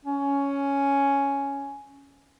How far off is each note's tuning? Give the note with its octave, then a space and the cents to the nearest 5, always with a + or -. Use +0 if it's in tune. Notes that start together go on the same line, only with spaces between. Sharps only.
C#4 +5